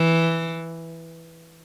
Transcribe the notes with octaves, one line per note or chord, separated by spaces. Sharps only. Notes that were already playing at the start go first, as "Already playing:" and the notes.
Already playing: E3